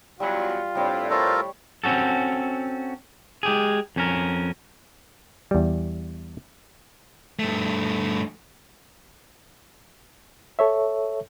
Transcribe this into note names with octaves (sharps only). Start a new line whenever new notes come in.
E2 F#3 G3 F4
A2 G3 C4 D4
F4 A4 A#4 C5 C#5 C#6
C4 C#4 F#4 A4
G#3 G4 G#4
F2 C#4 A#4
E2 G3
G2 A3
A4 C#5 E5